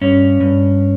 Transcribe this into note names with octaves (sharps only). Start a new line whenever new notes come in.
G2 C#4
G2